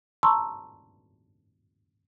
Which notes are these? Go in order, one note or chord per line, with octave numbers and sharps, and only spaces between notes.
A5 A#5 C6 C#6 E6